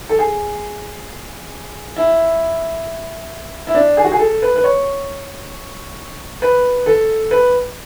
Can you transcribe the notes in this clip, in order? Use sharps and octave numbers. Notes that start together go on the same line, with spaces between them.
A4
G#4
E4
E4
D4
G#4
F#4
G#4
A4
B4
B4
C#5
B4
A4
B4